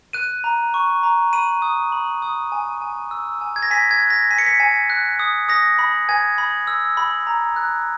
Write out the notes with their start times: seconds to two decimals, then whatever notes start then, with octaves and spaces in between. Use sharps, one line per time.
0.13 F#6 D#7
0.44 A#5
0.74 C#6
1.03 A#5
1.33 B5 D#7
1.62 D#6
1.92 B5
2.22 D#6
2.52 G#5
2.82 G#5
3.11 E6
3.41 G#5
3.56 G#6
3.63 A#6
3.70 G#5 B6
3.91 G#6
4.00 F#6
4.10 A#6
4.31 G#5 B6
4.38 C#7
4.46 B6
4.60 G#5
4.90 F#6
5.19 D#6
5.49 D#6 A#6
5.79 B5
6.09 G#5 G#6
6.38 B5
6.67 E6
6.97 B5
7.27 A#5
7.56 F#6